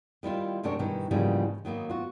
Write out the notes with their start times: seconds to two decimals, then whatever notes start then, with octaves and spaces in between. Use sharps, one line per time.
0.23 D#3 G3 E4 F4
0.64 F#2 C3 C4 D4 A#4 C#5
0.79 G2 B2 D#3 E3
1.11 G#2 C#3 E3 F3 G3 A#3
1.65 D#3 F#3 A#3 B3
1.89 F4 F#4